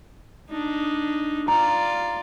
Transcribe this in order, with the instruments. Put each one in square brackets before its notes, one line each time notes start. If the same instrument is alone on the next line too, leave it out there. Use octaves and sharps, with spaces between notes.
[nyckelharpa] D4 D#4
[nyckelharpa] F4 D5 [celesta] A#5